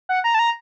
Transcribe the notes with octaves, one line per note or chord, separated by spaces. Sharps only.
F#5
A#5
A5
A#5